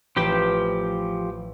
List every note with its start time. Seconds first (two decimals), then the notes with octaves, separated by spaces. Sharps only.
0.17 A1 F3 G4 G5 B5 E7